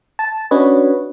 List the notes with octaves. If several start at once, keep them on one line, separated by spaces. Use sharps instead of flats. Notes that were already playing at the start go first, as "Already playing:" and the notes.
A5
C#4 D4 F#4 B4 C#5 D#5